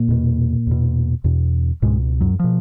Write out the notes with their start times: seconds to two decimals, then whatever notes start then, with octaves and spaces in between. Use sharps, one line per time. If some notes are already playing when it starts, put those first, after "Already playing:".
Already playing: A#2 A#3
0.08 E2 B2
0.67 E2 B2
1.24 E2 B2
1.82 C#2 G#2 B2 G#3
2.20 F#2 F#3
2.39 B2 F3